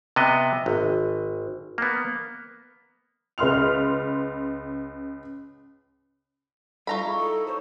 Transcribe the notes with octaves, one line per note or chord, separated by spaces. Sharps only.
C3 B3 D#5
G#1
A#3 B3
C#2 B4 C6 F6 F7
G3 F4 A4 A#5 B5 C#6
D#4 E4 G#4
A4
C5 C#5